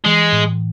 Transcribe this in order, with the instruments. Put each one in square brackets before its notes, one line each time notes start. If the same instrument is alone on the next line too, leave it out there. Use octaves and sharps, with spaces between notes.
[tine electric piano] E3 [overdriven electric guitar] G#3
[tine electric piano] A2